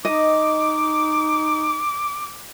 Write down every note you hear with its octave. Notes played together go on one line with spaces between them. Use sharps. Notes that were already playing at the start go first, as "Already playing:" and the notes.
D#4 D#5 D6